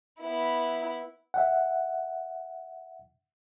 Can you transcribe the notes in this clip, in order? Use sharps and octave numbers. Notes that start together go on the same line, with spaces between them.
B3 E4
E5 F#5